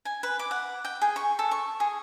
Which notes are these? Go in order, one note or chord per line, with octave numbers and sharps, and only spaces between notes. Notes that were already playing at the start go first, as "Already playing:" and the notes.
G#5
B4
D6
F#5
G5
G#4
C#6
A4
C#6
G#4